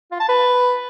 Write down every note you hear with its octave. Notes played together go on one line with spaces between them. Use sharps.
F4
A5
B4